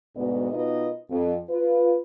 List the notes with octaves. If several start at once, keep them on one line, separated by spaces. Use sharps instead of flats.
D2 G#2 B2 B3 D5 D#5
B2 D#4 F4 A#4 B4 D#5
F2
F4 B4